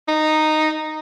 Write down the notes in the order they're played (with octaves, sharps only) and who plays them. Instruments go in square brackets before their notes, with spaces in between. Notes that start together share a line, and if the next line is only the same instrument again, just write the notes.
[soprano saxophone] D#4